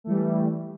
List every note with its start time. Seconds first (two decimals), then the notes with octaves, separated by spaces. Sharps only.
0.04 A3
0.07 E3
0.09 G3